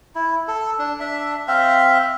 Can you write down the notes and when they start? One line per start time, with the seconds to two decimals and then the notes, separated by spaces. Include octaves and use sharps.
0.15 E4
0.48 A4
0.79 D4
1.00 D4 E5
1.48 C4 E5 F5